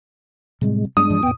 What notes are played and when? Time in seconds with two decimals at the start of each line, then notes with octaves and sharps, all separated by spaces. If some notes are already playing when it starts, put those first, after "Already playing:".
0.61 A2 C3 G3 G#3 C4
0.97 G2 G3 G#3 B3 D4 D#6
1.10 G2 E3 F3
1.23 E2 A2 B3 G5